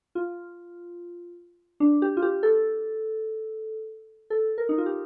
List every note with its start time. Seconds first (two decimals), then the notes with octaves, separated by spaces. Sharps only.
0.15 F4
1.80 D4
2.02 G4
2.17 F4
2.22 G4
2.43 A4
4.30 A4
4.58 A#4
4.69 D#4
4.78 F4
4.86 G4